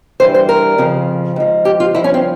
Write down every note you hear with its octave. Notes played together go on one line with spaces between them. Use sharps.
G2 E3 G3 C5
C5
A#4
F2 C#3 F3
G#2 F3
G4
F4
G2 F3 E4
C#4
C4